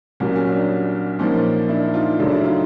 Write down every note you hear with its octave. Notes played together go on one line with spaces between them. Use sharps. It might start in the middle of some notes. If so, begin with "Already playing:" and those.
C2 A#2 F#3 A#3 C#4
C#4
D4
A#2 F3 A#3 C#4 D#4
D4 E4
D#4 F4
F#2 C#3 F#3 A3 D4 E4
D4 E4
D#4 F4